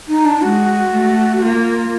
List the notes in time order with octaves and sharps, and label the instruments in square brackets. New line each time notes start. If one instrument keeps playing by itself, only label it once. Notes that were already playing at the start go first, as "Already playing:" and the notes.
[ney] D#4
D4
[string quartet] G#3 [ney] F#4
[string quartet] A3
[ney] F#4
[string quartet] A#3 [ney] F4